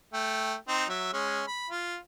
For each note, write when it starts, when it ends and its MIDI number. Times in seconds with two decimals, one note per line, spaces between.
0.14 0.55 57
0.14 0.55 79
0.68 0.85 60
0.68 0.85 63
0.89 1.10 54
0.89 1.10 76
1.13 1.43 56
1.13 1.43 61
1.47 1.68 83
1.70 1.97 65